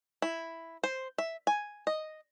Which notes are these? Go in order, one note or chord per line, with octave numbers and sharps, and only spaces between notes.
E4
C5
E5
G#5
D#5